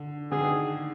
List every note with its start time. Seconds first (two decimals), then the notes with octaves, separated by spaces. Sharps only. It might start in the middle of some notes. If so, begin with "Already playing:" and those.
Already playing: D3
0.32 D3 G#4
0.40 D#3